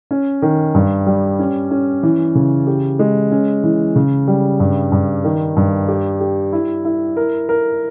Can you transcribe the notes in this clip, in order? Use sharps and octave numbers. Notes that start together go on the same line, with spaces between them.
C#4
D#3
G2
G3
C#4
C#4
E3
C#3
G4
G#3
C#4
E3
C#3
G3
G2
G2
D#3
G2
G4
G4
E4
E4
A#4
A#4